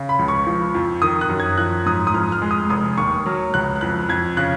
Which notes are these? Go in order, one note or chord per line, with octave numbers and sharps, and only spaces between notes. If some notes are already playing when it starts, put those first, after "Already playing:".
Already playing: C#3
B5
C#2
C#6
F3
F2
D#3 D#6
F#6
F#2
G#6
F3 F#6
G#2 D#6
D#6
F2 F6
F6
G#3
D#6
F1 D#6
D#2 C#6
F#3 F6
C#2 F#6
F2 F#6
F2 G#6
C#3 F#6